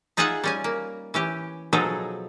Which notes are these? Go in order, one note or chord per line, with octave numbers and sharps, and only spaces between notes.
D#4 F4 G#4 D#5 E5 F#5
G3 C#4 G#5
A#3
E3 C#4 G4
B2 F3 F#3 D#4 G#4 A4